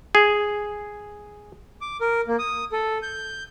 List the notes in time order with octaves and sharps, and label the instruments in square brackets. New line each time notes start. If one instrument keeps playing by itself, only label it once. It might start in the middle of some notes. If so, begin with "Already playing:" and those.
[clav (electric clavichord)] G#4
[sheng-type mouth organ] D6
A#4
A#3
D#6
A4
G6